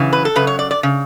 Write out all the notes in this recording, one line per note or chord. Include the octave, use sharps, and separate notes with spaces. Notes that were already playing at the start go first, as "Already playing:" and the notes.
Already playing: F#2 C#3 E3
B4
A4
F#2 C#3 B4
C#5
D5
D5
C#3